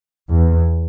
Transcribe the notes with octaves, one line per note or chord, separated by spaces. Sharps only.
E2